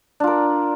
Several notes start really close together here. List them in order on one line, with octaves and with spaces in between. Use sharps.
D4 F4 A#4